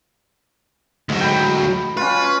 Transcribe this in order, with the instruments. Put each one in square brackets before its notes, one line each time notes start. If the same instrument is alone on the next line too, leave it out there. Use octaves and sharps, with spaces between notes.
[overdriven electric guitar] D2 F#3 [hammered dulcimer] G#2
[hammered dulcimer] G5 B5
[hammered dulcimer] C#4 F4 [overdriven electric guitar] B4